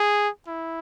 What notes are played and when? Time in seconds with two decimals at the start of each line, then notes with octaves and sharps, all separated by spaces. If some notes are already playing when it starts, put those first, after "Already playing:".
Already playing: G#4
0.47 E4